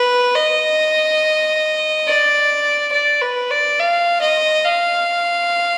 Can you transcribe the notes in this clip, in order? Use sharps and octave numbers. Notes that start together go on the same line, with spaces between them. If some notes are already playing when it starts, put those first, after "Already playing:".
Already playing: B4
D#5
D5
D5
B4
D5
F5
D#5
F5